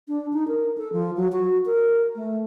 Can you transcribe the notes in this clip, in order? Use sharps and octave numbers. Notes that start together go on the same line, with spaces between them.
D4
D#4
A#4
A4
F3
F#3
F#4
A#4
A3